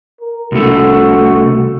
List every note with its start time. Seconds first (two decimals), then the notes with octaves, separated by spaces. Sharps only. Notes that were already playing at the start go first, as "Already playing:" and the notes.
0.21 A#4
0.52 C2 A3 F#4